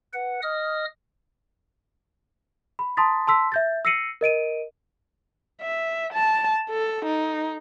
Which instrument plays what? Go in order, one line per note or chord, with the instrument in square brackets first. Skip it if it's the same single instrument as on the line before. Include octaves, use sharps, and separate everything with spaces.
[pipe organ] B4 F#5
D#5 D#6 F6
[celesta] B5
A5 A#5 C6 D#6 A6 B6
A5 C6 E6 B6
E5 G6 A6
E6 A#6 C7 C#7 D#7 F#7
A#4 D#5 D7 D#7
[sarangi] E5
A5
A4
D#4